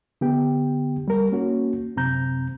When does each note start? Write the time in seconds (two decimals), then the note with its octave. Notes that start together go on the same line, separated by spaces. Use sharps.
0.21 D3 B3 G4 G5
1.08 G3 A#4
1.32 A#3 C#4 F#4
1.96 F#2 C3 C4 A#5 G6